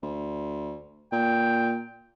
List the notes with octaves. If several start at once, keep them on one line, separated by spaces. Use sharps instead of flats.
D2
A#2 G5